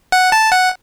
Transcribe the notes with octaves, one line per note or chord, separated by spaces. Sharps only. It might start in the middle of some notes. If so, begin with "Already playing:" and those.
F#5
A5
F#5